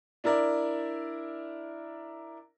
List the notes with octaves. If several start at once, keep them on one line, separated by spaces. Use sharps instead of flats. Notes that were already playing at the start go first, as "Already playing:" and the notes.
D4 E4 A#4 D5